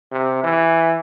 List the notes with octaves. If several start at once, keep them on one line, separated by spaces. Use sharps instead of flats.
C3
E3